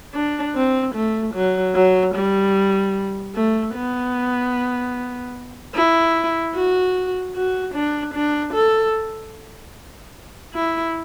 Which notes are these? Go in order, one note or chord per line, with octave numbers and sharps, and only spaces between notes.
D4
C4
A3
F#3
F#3
G3
A3
B3
E4
F#4
F#4
D4
D4
A4
E4